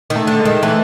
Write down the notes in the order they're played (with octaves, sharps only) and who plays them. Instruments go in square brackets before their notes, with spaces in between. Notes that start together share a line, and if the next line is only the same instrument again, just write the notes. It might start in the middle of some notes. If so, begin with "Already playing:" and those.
[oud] D#3
[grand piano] A3
[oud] D3
[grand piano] G#3
[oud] D#3
[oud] E3 [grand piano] A3